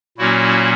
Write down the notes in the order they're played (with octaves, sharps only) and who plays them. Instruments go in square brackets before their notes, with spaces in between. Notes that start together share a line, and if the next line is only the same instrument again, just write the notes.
[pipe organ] A#2 F#3 A#3 C#4 E4 F#4